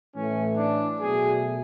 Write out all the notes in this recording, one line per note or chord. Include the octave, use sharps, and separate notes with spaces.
A2 E3 A3 C#4
D4
B2 F#3 A3 G#4